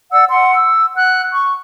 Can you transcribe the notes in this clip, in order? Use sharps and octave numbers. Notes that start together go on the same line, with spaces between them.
D5 F#5 E6
F#5 C6
E6
F#5 F#6
C#6